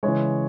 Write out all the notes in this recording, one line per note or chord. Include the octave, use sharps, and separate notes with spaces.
C#3 E3 G#3 C#5